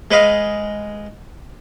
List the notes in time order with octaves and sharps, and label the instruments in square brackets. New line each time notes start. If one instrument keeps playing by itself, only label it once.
[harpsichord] G#3 B4 D#5 F5